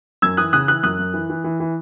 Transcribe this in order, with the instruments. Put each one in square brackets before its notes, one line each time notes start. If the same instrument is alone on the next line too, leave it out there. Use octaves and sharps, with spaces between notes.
[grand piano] F#2 E6 G#6
E3 D#6 F#6
C#3 D#6 F#6
E3 D#6 F#6
F#2 D#6 F#6
F#2
E3
E3
E3
E3